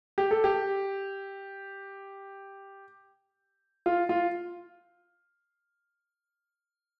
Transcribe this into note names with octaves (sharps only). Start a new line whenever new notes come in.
G4
A4
G4
F4
F4